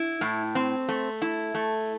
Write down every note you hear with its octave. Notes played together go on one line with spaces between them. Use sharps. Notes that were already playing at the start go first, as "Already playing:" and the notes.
Already playing: E4
A2
C4
A3
E4
A3